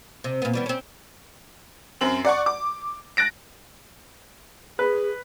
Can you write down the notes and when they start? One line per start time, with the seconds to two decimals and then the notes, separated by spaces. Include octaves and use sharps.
0.24 C3
0.42 A#2 B3
0.53 E3 G3 B3
0.66 C4 C#4
2.01 F#2 C4 F#7
2.25 D5 F#5 C#6
2.46 D6
3.17 F#6 A6 A#6 D7
4.79 G#4 B4